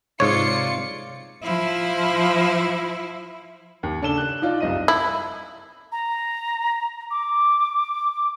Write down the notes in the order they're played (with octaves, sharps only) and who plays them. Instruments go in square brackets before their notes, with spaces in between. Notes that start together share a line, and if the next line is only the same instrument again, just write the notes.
[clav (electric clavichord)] G#2 C#5 [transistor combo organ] C3 D5 [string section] F4 C#7
[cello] F3 E4
[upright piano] D#2
C#3 D4 A4 E7 G7
F#6
D#4 F4 D5
F#1 C2 D#5 D#7
[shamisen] E4
[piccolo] A#5
D6